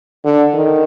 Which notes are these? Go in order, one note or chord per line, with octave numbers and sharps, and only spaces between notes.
D3
D#3